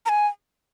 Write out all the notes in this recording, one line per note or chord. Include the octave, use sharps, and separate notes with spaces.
A#5
G#5